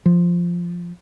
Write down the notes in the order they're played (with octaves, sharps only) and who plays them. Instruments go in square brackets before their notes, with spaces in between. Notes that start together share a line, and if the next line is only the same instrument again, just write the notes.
[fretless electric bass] F3